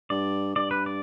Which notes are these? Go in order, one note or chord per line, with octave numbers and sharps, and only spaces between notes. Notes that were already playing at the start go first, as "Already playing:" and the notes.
G2 D5
G2 D5
B4
D5